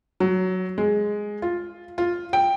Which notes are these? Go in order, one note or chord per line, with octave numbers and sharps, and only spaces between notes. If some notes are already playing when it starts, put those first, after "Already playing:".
F#3
G#3
F4
F4
G5